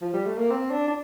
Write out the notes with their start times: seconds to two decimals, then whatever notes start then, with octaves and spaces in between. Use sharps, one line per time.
0.01 F3
0.14 G3
0.26 A3
0.38 A#3
0.50 C4
0.71 D4
0.87 D4